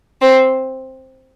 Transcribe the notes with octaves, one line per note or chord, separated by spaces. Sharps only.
C4